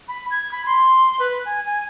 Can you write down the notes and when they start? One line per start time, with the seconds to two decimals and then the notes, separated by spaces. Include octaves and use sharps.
0.08 B5
0.31 G#6
0.52 B5
0.66 C6
1.19 B4
1.45 G#5
1.66 G#5